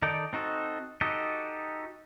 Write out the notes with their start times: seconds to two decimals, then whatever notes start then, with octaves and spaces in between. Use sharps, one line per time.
0.02 D#3 D#4 A4 D5 G5
0.33 C4 D#4 F#4 A4
1.01 D#4 F#4 G4 A4 D#5